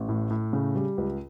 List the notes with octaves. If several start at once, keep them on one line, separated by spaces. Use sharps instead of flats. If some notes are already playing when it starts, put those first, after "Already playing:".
Already playing: A1
A2
A2
C#3
G3
C#2